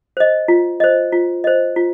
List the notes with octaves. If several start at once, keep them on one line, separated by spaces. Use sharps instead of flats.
C5 D#5
F4
C5 D#5
F4
C5 D#5
F4